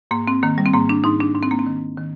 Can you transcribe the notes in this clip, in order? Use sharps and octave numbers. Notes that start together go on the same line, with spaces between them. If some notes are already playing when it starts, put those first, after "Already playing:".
G#2 A#3
C4
D#3 A#3
G3
C4
G#2 A#3
D4
G#2 D#4
D4
G#2 D4
C4
A#3
C4
D#3
D#3